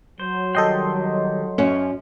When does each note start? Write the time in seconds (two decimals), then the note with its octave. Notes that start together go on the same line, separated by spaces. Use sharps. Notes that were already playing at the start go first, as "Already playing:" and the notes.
0.20 F#3 C5
0.55 D#3 G3 A4 D#5 G5 C6
1.58 F#2 C#4